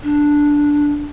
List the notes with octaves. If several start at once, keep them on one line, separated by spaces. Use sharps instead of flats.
D4